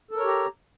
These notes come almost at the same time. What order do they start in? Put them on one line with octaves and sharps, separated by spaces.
A4 A#4 C#5 G4 A#5